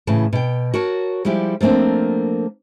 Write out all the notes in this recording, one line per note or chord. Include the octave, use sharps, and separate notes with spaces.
A2 C#3 E3 A5
B2 G5
F#4 A#4 C#5 A5
F3 G3 G#3 E4 G4
F3 A3 A#3 C4 D4